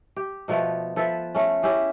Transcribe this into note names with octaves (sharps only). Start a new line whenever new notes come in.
G4
B2 F3 A3 B3
F3 A4 B4 E5
A3 C#4
C#4 E4 G4 G#4